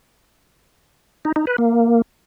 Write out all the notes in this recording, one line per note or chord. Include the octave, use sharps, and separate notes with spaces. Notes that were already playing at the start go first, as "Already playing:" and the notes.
D#4
D#4
B4
A#3